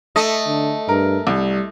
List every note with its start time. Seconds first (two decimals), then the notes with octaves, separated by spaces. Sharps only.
0.16 A3 D#5
0.47 D3
0.89 G2 A#4
1.27 C2 G3